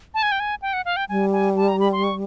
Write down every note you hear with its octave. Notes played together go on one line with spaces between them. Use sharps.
A5
G#5
G5
G#5
G5
F#5
F5
G5
G3 G#5
G#5
A5
A#5
B5
C6
C#6